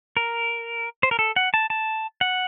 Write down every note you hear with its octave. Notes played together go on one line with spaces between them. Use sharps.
A#4
C5
A#4
A4
F#5
A5
A5
F#5